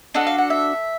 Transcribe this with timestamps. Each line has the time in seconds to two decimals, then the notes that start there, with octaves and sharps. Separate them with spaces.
0.14 D4 F#4 A4 D#5
0.27 F5
0.38 F#5
0.50 E5